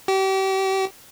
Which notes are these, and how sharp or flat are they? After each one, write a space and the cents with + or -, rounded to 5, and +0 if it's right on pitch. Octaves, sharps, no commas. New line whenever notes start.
G4 -35